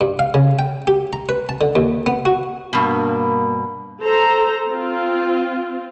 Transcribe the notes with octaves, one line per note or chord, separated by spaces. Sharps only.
G2
F5
C#3
G5
G4
A#5
B4
A5
D3
D#2
B3
F#4
G2 B2 A#3
A4 C5 A#5
C4 F4